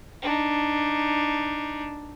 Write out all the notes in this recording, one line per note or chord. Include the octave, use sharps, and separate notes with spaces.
D4 D#4